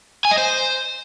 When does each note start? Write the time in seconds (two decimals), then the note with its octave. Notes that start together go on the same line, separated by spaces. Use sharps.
0.25 G#5
0.31 D#5
0.38 C5